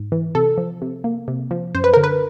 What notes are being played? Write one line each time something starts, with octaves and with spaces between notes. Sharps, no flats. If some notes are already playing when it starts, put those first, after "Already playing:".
Already playing: G#2
E3
C3 A4
F3
C3
A#3
C3
F3
F#2 C5
B4
D3 A#4
B4